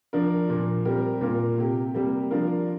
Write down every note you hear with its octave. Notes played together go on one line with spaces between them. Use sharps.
F3 D4 A#4
A#2 F3 A#3
G3 C4 G4 A#4
A#2 A#3 F4 A#4
C3 A#3 G4
C3 G3 A#3 G4
F3 D4 F4 A#4